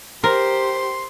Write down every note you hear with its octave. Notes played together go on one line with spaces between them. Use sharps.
G4 A#4 C5 C6